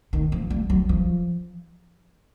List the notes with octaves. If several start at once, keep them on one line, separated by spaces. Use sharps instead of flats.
D#3
F3
G3
F#3
F3